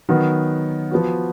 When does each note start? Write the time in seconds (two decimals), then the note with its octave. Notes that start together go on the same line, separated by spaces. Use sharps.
0.09 D#3 F#3 B3 F#4
0.91 F3 B3 F#4